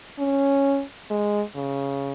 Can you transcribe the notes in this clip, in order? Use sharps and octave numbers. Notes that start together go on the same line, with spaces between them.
C#4
G#3
C#3